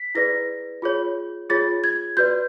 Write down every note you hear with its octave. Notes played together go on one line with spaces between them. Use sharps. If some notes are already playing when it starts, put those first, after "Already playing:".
Already playing: B6
E4 G#4 B4 D5 A#6
F4 G#4 C#5
F4 G#4 C#5 A6
G#6
F#4 B4 D5 G6